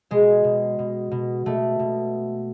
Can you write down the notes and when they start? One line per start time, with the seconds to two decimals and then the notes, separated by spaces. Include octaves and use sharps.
0.11 B2 G#3
0.44 B2
0.79 B2
1.11 B2
1.46 B2 A3
1.79 B2